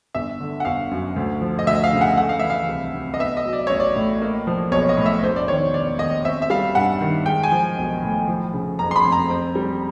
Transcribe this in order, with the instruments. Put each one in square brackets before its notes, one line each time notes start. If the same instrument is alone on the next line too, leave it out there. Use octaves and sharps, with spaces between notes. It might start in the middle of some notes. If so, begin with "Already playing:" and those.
[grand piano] G1 E5
D3
F#5
G1 F5
F#2
D2
F3
D#5
D2 E5
F5
C#3
F#5
A3 F#5
F5
E3 E5
F5
C2
C3
D#5
B3 E5
D#5
F#3
D5
A1 C#5
D5
A2
A#3
F3
B1 C#5
D#5
A2
E5
E1 C5
D5
D#3 C#5
E1 D5
D#2 D#5
C4 E5
E5
G3 F5
G2 F#5
D#3
G#3 G5
G#5
F3
B1
A2
F3
C#3
F#1 A#5
C6
B5
F2
A#5
C4
G3